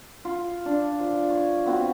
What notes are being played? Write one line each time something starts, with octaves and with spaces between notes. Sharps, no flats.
F4
D4
F3
C#5
B3 C4 F#4